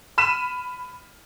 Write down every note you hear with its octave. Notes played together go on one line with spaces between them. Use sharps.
B5 F6 B6 D#7 E7